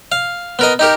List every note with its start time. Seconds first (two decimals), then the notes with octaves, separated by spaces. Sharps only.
0.12 F5
0.59 B3 A#4 D#5
0.79 D#4 G4 A#4